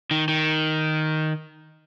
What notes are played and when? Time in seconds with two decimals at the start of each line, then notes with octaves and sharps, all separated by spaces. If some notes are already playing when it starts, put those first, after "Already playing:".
0.11 D#3
0.28 D#3